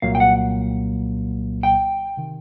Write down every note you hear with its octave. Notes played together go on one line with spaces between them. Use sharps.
C2 A#2 F#3 A#3 F5
G5
F#5
G5
C3 D#3